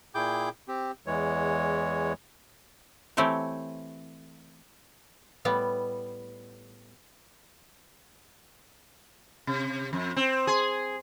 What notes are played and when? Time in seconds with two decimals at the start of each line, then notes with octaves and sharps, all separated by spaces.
0.15 A#2 E4 G#4 G5 D6 G6
0.68 C4 G4
1.06 E2 E3 G#3 C#5
3.17 E3 A3 C4 G4 C#5
5.45 A2 G3 B3
9.47 C3
9.93 F2
10.16 C4
10.47 G#4